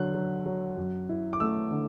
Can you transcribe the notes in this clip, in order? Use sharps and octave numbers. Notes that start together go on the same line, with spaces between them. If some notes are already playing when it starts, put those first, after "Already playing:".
Already playing: D3 F#3 F#6
F#3
F#3
F#2
E4
D6
A3 E6
D3